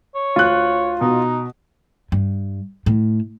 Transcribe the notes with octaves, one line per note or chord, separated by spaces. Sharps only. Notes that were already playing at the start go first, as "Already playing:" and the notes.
C#5
D2 F4 F#6
B2 D#4
G2
A2